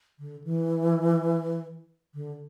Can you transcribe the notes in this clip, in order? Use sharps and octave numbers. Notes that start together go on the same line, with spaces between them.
D3
E3
D3